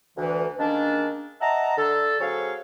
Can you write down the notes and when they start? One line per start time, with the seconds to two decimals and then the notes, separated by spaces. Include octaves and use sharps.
0.17 D2 E3
0.58 D#3 G#3 A#3 C#4 D4
1.40 D#5 E5 F#5 A5 A#5
1.77 D3 A4
2.20 F#3 C4 G#4 A4 C#5 F5